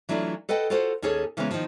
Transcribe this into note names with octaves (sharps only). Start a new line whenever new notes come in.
E3 F#3 A3 D4 E4 F4
A4 B4 D#5 F#5 G5
F4 F#4 A4 C5 F#5
D#2 C#4 G#4 A4 C#5
C#3 E3 G#3 A#3 B3 C#4
D#3 F3